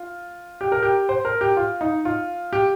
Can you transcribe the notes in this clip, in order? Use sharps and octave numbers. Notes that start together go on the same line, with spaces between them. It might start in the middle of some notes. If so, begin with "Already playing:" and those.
Already playing: F4
G4
A#4
G4
C5
A#4
G4
F4
D#4
F4
G4